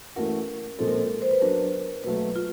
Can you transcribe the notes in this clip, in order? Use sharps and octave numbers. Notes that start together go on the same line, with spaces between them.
E3 A3 C#4 F#4 A#4
A#2 F3 G#3 C4 A4
A#4
A4
C5
B4
F#3 B3 D4 A#4
B2 F#3 A3 B4
F4